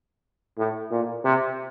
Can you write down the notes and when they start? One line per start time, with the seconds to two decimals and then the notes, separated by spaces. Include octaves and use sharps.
0.58 A2
0.91 A#2
1.24 C3